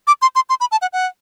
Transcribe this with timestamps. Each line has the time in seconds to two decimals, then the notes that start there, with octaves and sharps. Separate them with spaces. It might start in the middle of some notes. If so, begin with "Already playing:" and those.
0.07 D6
0.22 C6
0.35 C6
0.49 C6
0.60 B5
0.71 A5
0.81 F#5
0.93 F#5